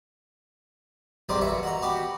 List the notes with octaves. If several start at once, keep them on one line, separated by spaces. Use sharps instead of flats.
B1 G#2 G3 C4 G4 C6
D#2 B2 E5 C#6
F#4 A#5
B3 F#4 G4